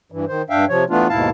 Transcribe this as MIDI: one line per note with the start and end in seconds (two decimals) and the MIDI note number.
0.12 0.25 43
0.12 0.25 52
0.28 0.42 51
0.28 0.42 72
0.50 0.65 43
0.50 0.65 62
0.50 0.65 76
0.50 0.65 77
0.50 0.65 79
0.69 0.84 48
0.69 0.84 53
0.69 0.84 73
0.90 1.08 52
0.90 1.08 57
0.90 1.08 59
0.90 1.08 62
0.90 1.08 65
1.09 1.30 39
1.09 1.30 44
1.09 1.30 47
1.09 1.30 64
1.09 1.30 77
1.09 1.30 81